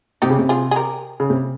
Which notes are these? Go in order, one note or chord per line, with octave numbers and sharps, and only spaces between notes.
C3 D#4 G4
C#3
C3
F4 G#4
G#4
G4 A#4
C#3
C3